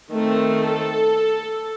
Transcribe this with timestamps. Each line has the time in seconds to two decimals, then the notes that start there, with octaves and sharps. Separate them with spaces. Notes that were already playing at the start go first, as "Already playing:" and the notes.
0.12 D#3 A3 C4
0.62 A4